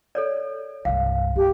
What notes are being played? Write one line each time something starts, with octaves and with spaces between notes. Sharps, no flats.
A4 C#5 D5
C2 G2 F5
G2 G4